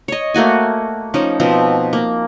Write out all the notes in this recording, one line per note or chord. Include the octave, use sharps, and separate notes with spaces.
C#5 D#5
A3 A#3 F#4 G#5
F3 C#4 D#4
B2 F3 C4
A#3